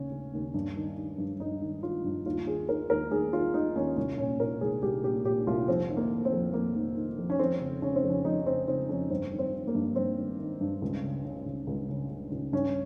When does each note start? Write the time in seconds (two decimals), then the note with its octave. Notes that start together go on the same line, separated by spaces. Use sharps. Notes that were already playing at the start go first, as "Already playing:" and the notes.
Already playing: D#2 C#3 C#4
0.12 C#3
0.33 D#2
0.54 G2
0.76 D#3
0.97 D#3
1.18 G2
1.40 G2 D#4
1.62 D#3
1.83 D#3 F4
2.04 G2
2.26 D#2 F4
2.47 D#3 G#4
2.68 D#3 A#4
2.90 D#2 A#4
3.11 D#2 G#4
3.33 D#3 F4
3.54 D#3 D#4
3.75 D#2 C#4
3.97 C2 C#4
4.18 A#2 C#4
4.39 A#2 A#4
4.61 C2 G#4
4.82 C2 G4
5.04 A#2 G4
5.25 A#2 G4
5.47 C2 F4
5.68 F2 C4
5.89 D#3
5.97 A#3
6.11 D#3
6.25 C4
6.32 F2
6.54 F2 A#3
6.75 D#3
6.96 D#3
7.18 F2
7.30 C#4
7.39 F2 C4
7.61 C#3
7.82 C#3 C#4
7.96 C4
8.03 F2
8.10 C#4
8.25 F2 D#4
8.46 C#3 C4
8.68 C#3 C4
8.89 F2 C#4
9.10 G2 C4
9.32 D#3
9.39 C4
9.53 D#3
9.67 A#3
9.75 G2
9.96 G2 C4
10.17 D#3
10.39 D#3
10.61 G2
10.82 C#2
11.03 C#3
11.25 C#3
11.46 C#2
11.67 C#2
11.89 C#3
12.10 C#3
12.31 C#2
12.53 G2 C#4